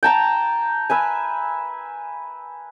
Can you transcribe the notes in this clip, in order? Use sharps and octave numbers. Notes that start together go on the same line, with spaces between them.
G5 A5 A#5
B4 E5 G#5